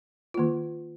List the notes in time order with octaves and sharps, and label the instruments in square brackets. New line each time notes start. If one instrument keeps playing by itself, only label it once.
[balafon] D#3 A#3 F4